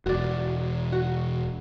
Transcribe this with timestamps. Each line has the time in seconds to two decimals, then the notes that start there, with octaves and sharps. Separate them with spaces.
0.06 E1 F#4 D5
0.92 F#4